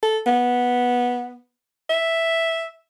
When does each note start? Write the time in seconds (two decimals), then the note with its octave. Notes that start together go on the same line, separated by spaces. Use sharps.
0.03 A4
0.26 B3
1.90 E5